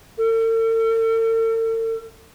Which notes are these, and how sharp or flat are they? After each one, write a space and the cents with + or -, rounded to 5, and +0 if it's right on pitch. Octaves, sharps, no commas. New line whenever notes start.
A4 +45